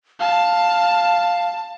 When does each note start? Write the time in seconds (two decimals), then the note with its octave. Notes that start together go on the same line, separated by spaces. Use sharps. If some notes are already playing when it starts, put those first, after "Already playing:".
0.20 F5 A5